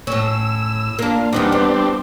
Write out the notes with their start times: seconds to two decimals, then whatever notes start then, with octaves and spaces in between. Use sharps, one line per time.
0.07 A2 C#4 E6
0.99 A#3 D4 F4
1.33 E2 G3 B3 C4 D4 D#4
1.52 B3